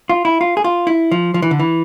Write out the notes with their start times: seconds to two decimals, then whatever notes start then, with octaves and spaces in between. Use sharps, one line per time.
0.09 F4
0.25 E4
0.41 F4
0.57 G#4
0.64 F4
0.87 E4
1.11 F3
1.34 F3
1.42 E3
1.51 D3
1.59 E3